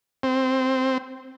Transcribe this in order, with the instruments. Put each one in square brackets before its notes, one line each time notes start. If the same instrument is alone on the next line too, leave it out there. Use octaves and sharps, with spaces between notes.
[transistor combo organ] C4